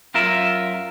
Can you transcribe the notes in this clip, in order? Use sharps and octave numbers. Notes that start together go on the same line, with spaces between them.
F#2 F4 A#4 E5